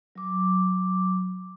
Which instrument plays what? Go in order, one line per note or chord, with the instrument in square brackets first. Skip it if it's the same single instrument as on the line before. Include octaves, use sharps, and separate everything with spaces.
[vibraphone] F#3 D6